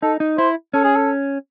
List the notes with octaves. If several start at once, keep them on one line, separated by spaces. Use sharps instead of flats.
D#4 A4
D#4
E4 C5
C#4 A4
G#4
A4